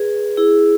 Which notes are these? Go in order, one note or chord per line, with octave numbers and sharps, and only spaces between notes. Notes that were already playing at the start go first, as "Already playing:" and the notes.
Already playing: G#4 B4
E4 G#4